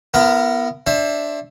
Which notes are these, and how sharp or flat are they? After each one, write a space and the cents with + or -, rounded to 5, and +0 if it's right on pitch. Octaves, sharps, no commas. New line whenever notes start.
B3 +0 E4 +45 A#4 +0
D4 +0 C5 +35 E5 +0